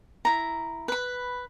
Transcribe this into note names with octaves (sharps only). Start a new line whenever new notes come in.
E4 A#5
B4 B5